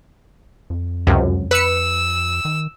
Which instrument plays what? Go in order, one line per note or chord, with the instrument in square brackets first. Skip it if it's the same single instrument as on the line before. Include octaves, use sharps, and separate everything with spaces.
[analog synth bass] F2
[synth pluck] C#2 F#2 C3
[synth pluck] B4 C#7 [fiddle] E6
[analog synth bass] D#3